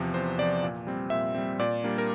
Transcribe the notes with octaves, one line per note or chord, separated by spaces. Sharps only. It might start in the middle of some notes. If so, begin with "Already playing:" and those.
Already playing: E2 C3 F3
E2 C5
C3 F3 D5
A#2
G3 C4
A#2 E5
G3 C4
A#2 D5
G3 A#3 D4
A#4